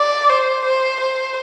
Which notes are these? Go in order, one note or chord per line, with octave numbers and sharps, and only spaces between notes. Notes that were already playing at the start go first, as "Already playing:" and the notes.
Already playing: D5
C5
C5
C5